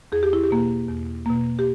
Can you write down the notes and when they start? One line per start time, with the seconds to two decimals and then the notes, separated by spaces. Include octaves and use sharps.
0.12 E2 G#4
0.23 G4
0.33 E4
0.43 G4
0.51 B2 A#3
0.88 E2
1.26 B2 A#3
1.59 G4